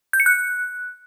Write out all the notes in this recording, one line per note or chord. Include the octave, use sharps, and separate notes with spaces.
G6
C#7
F#6